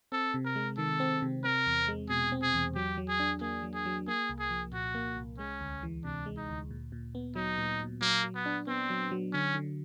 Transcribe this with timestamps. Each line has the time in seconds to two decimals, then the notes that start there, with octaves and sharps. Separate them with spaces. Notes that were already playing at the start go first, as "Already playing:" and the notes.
0.12 C4 A4
0.34 C3
0.45 A#4
0.56 G#3
0.78 D#3 A4
1.00 C4
1.22 C3
1.44 C4 A#4
1.67 E2
1.88 G#3
2.10 B2 G#4
2.32 C4
2.42 G#4
2.54 E2
2.75 F#3 G4
2.97 F#3
3.09 G#4
3.20 D4
3.41 A#3 G#4
3.63 F#3
3.74 G#4
3.86 F#3
4.08 A#3 G#4
4.29 C2
4.39 G#4
4.50 F3
4.72 A#2 F#4
4.95 A#3
5.17 C2
5.38 G#3 C#4
5.61 D2
5.83 E3
6.04 C3 D4
6.26 G#3
6.37 D#4
6.49 D2
6.71 A#2
6.92 A#2
7.15 B3
7.35 F#3 D#4
7.58 A#2
7.80 A#2
8.01 F#3 A#3
8.24 F#3
8.35 B3
8.46 D4
8.67 B3 C4
8.90 F#3
9.11 F#3
9.33 D3 C#4
9.55 D3